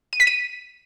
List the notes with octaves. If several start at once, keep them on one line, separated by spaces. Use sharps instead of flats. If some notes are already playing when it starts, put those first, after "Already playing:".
D#7
B6
D#7